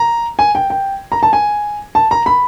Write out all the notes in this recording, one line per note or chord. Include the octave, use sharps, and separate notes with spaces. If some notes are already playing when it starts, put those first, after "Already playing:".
Already playing: A#5
G#5
G5
G5
A#5
A5
G#5
A5
A#5
B5